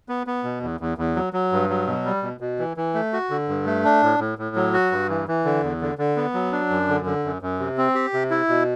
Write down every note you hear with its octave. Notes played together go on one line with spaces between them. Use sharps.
B3
B3
B2
E2
E2
E2
F#3
F#3
G2
F#3
B2
G3
B2
B2
E3
E3
A3
F#4
D3
G2
A3
D4
A2
A2
A2
F#3
F#4
G2
E3
E3
D3
E2
D3
D3
B3
F#3
D4
F#2
D3
D3
F#2
F#2
C3
C4
G4
C3
E4
B2